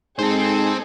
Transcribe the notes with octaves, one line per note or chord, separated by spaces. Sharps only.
G#2 C4 D#4 G#4 A4 C5